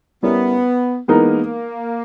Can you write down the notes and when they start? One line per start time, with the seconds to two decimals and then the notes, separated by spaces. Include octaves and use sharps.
0.23 G3 B3 C#4 E4 A#4 C#5
1.08 E3 G#3 A#3 B3 D#4 A#4